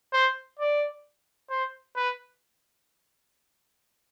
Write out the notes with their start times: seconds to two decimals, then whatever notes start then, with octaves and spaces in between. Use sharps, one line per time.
0.13 C5
0.59 D5
1.50 C5
1.96 B4